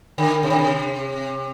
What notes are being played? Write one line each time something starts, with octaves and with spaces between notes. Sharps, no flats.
D3
C3
D3
C3